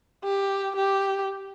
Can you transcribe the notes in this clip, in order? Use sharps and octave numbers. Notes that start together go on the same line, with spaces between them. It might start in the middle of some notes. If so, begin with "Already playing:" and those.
G4
G4